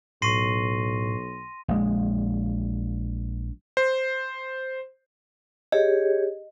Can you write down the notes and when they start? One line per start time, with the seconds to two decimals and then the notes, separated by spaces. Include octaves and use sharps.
0.22 B1 A2 C6 C#6 A#6 C7 D#7
1.68 A#1 G#3
3.77 C5
5.72 G4 G#4 C#5 D#5